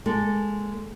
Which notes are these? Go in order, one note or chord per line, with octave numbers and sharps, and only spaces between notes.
G#3 A#3 A4